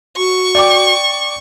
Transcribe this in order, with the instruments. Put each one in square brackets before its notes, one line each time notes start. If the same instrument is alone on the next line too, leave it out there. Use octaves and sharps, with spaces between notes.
[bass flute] F#4 [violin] C#6
[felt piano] D5 G5 D6